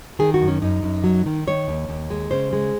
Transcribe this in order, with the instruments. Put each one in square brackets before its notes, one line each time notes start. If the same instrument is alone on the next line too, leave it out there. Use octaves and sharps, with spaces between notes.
[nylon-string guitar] D#3 G#4
F#4
F#2
C#4
F#2 D#4
F#2
F#3
D#3
D#3 C#5
D#2
D#2
G#3
C#3 C5
G#3